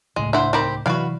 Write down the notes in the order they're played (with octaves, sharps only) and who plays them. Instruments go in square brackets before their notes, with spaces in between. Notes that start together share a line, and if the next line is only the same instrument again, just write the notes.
[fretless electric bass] D#1 C#2 A2 [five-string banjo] G#3
[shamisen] D4 E4 F#5 [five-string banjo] C5 E5
[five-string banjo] C4 G4 [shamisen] D#4 A#4 B5
[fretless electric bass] C3 E3 F#3 [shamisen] E4 D5 [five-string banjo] F#4 B4 F5